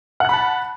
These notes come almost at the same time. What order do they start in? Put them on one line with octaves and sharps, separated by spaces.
F#5 F#6 B5 A5